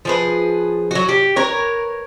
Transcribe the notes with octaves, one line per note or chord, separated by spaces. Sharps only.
F3 G#4 B4
F#3 F#4
G4
A#4 B4 C#5